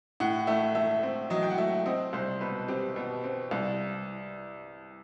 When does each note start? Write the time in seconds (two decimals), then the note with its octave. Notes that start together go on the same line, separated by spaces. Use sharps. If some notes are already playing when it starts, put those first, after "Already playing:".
0.20 A2 F#5
0.47 A3 E5
0.75 A3 E5
1.03 C4
1.30 F#3 D#5
1.43 G5
1.50 F#5
1.58 A3 E5
1.86 C4 D#5
2.13 C2 C5
2.41 B2 B4
2.68 C4 G4
2.96 B2
3.24 C4
3.51 C2